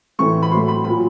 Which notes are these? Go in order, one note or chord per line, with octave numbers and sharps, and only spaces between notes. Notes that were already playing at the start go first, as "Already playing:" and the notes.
A2 E3 A3 C#6
B5
A2 F#3 A3 C6
B5
A#2 F#3 A#3 B5